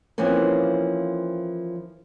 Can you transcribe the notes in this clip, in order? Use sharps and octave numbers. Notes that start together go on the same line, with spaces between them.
E3 F3 A#3 C4 C#4